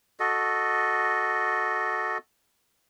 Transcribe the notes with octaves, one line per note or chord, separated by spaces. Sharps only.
F#4 A4 D#5